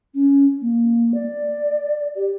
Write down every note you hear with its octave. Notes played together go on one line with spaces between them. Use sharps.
C#4
A#3
D5
G4